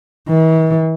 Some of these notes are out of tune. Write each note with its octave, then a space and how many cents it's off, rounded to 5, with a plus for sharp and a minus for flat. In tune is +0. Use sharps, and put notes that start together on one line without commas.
E3 -45